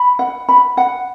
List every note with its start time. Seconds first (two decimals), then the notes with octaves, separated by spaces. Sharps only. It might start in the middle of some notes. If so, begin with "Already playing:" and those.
Already playing: B5
0.19 F#5
0.49 B5
0.77 F#5